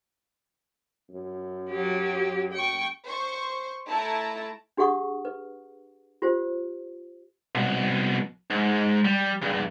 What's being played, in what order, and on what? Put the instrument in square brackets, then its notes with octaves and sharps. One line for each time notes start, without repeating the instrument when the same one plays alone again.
[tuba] F#2
[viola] F#3 G4
G5 C#6
[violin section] C5 C#6
A3 E4 A5 A#5
[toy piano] D4 G4 G#4 F#5 C#6 D#6
B4
F4 G4 C5
[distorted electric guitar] C2 B2
G#2
G3
E2 G2